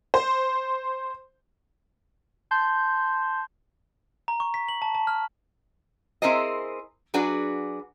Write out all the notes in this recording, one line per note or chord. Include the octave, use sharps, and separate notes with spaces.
C5
A5 C6 G6
A#5
C#6
B6
F#7
A5
A5
F6
C4 E4 G#4 A#4 C5 D#5
F#3 D4 F#4 G#4 B4 D5